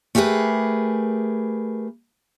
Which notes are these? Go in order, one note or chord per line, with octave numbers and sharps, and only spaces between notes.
A3 G4 G#4 A#4 B4